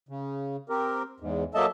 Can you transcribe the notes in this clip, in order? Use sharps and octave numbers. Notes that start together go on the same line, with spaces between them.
C#3
C4 G4 A#4
E2 G#2
F#3 A#3 A4 D#5 E5 A5